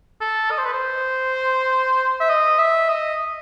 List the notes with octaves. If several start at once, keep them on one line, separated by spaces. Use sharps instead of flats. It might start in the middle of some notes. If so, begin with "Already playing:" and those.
A4
D#5
C5
B4
C5
E5
D#5
E5
D#5